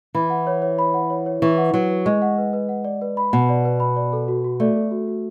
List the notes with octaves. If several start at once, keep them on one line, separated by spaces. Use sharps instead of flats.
E3 B5
F#5
C#5
C#5
B5
F#5
C#5
C#5
E3 C#6
F#5
F#3 B4
B4
G#3 C#6
F#5
B4
B4
F#5
D5
B4
B5
B2 F#5
D5
B4
B5
D5
A4
F#4
F#4
A3 D5
A4
F#4
F#4